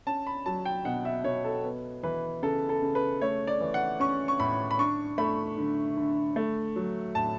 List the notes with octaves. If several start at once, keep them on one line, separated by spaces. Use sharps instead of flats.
C#4 A5
B5
F#3 A5
G5
B2 F#5
E5
B2 C#5
A4
B3
E3 B4
C#3 A4
A4
C#3
B4
A3 C#5
D5
E3
F#5
C#4 C#6
C#6
A2 B5
B5
D4 C#6
A3 B5
D3
D3
A3
F#3
A2 A5